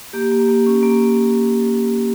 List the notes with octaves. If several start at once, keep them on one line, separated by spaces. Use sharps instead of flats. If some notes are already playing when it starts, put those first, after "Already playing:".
A#3 G4
A#3
A#3
C#4
A#3